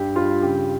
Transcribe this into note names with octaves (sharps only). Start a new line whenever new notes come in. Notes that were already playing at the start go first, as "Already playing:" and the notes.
Already playing: G2 G4
G3 F4
C#3 G4